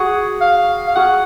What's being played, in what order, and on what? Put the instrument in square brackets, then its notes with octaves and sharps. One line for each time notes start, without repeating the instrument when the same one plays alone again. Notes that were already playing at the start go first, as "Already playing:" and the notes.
Already playing: [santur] F#4 G#4 [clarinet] F#5
[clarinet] F5
F5
[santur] F#4 G#4 [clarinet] F#5